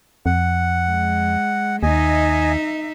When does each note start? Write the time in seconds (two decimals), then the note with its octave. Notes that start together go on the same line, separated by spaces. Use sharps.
0.26 F2 F#5
0.90 G#3
1.83 D#2 D#4 D#5 E5 G#5